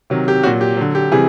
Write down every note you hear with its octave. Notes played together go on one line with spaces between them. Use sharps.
C3 D#3 F#3
G4
A#2 F#3 F#4
G4
D3 F#3
G4
C3 E3 G3 G#4